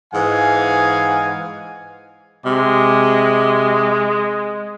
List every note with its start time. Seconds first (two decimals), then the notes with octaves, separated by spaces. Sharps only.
0.14 G#2 E3 D#5 F5 F#5 G#5
2.45 C3 G#3